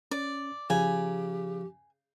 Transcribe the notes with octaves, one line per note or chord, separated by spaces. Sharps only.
C#4 D5
C#3 F3 G4 G#5